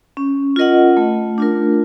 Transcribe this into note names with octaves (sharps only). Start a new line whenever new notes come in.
C#4
F4 A#4 D#5 F#5
A3
D4 F4 A#4